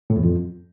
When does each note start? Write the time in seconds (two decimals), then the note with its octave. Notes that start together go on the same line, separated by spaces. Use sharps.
0.10 A2
0.17 E2
0.23 F2